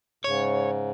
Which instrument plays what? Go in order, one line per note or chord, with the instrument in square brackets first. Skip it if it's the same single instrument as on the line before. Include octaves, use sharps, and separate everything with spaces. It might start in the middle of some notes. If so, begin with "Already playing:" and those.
[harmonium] G#2 C#3 [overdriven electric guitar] C#5